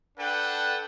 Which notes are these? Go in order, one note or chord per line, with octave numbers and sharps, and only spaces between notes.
D4 A4 B4 F#5 G5